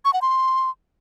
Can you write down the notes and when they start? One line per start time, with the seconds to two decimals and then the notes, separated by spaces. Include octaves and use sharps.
0.05 C#6
0.13 F#5
0.22 C6